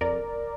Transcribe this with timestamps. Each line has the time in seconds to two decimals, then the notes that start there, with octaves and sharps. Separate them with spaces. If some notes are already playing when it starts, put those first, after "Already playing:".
0.01 F2 A#4 D5